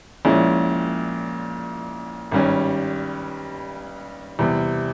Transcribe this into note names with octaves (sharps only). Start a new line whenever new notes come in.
A#1 A#2 G#3 C#4 E4
G#1 G2 G3 C#4
E2 C3 G3